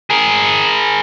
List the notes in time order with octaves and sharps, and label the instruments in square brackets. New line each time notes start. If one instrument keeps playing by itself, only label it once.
[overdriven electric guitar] G#4 A#4